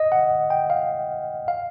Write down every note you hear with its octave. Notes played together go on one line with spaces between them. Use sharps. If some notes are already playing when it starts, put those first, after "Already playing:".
Already playing: D#5
F#5
G5
F5
F5